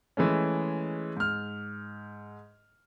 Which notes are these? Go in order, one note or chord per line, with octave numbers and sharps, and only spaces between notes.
E3 G#3 A3 C#4
G#2 F6